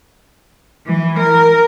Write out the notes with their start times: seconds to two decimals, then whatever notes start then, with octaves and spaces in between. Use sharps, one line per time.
0.87 E3
1.18 A#4